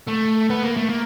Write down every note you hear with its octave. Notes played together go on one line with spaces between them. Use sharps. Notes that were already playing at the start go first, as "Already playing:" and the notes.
A3
B3
A#3
A3
A#3